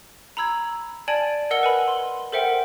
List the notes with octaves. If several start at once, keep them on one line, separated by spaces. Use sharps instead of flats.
A#5 B5 E6 G#6
D5 G#5 A5 G#6 D7 F#7
A#4 D#5 F#5 E6 C#7 G7
B4 G#5 B5
C6
A4 A#4 C5 E5 F#5 G5